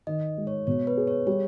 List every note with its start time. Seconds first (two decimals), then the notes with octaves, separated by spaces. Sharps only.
0.07 D#3 D#5
0.38 G#3
0.47 C#5
0.67 B2 C#5
0.87 B4
0.97 G#4
1.07 C#5
1.27 G3 C#5